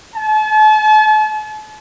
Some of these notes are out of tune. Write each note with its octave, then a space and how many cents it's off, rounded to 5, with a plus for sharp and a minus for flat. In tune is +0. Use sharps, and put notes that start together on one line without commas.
A5 -40